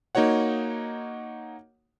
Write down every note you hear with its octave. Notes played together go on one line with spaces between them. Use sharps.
A#3 D#4 F#4 C#5 F#5